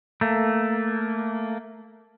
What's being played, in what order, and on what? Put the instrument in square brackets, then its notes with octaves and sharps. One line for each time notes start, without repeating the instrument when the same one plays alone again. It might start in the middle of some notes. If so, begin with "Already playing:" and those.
[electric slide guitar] A3 A#3